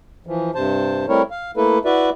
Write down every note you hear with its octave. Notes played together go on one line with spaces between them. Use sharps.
E3 F3
G2 C3 C5 A5
G3 A3 C4 E4 A#4 C#5
F5
A3 A#3 E4 A4 B4
E4 F#4 B4 D5 E5